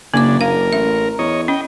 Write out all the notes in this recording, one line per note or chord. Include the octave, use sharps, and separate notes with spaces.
F#1 C#3 A#3 D4 D6
A#4 F5
A1 E5
E2 C#5 D#5
C#4 D#5 G5